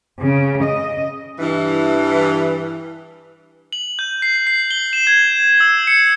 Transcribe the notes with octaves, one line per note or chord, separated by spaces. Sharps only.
C#3
D#5
G2 E3
F#7
G6
C7
C7
G7
E7
G#6
E6
C#7